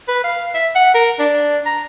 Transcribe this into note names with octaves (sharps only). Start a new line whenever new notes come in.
B4
F5
E5
F#5
A#4
D4
A#5